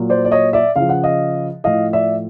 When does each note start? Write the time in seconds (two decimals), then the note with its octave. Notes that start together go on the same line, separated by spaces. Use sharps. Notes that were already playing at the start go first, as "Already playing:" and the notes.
Already playing: A#2 F#3
0.10 C5 D5
0.25 D5
0.32 C#5 D#5
0.53 D5 E5
0.76 C#3 F3 F5
0.89 F#5
1.04 D#5 F5
1.64 A2 F3 D#5 F5
1.93 D5 E5